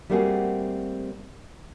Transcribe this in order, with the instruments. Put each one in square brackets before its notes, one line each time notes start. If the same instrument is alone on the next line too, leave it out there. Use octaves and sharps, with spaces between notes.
[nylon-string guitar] G3 A3 A#3 C4 F#4 G#4